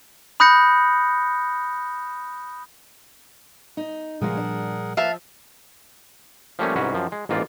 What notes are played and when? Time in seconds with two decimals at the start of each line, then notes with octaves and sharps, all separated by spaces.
0.40 B5 D#6 F#6 G6 A#6 C#7
3.77 D#4
4.21 A#2 C#3 F3 G3 G#3 G#4 A#4 F#5
4.37 D4
4.97 F3 A#3 B4 E5 F5 A5
6.59 F3 G3 A3 A#3 C#4
6.76 C2 G#2 C#4 F#4 B4
6.94 F#2 F3
7.12 G#3
7.29 A1 G#2 A#3 F4 D5